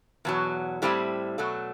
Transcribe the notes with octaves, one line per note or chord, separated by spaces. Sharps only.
E2 B2 F#3
A2 G3 C4 E4
B2 F#3 A3